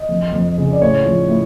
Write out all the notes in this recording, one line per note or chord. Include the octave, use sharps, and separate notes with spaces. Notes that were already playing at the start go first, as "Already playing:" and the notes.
Already playing: D#5
F2
F2
C#3
D5
A2 C#5
F3
A2